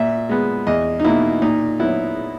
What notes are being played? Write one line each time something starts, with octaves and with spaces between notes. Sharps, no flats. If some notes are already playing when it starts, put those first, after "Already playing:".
Already playing: A#2 E5
G#3 B3
E2 D#5
D#4
B2 A#3 E4
A#2 D#4
F#3 B3 E4